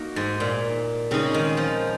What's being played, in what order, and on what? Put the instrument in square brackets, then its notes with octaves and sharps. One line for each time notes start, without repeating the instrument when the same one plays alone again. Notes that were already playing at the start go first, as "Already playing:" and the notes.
Already playing: [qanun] A#3 D#4 F#4 A#4
[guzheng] G#2
A#2
[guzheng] C#3 [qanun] G#3 C4 D#4 G#4
[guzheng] D#3
F3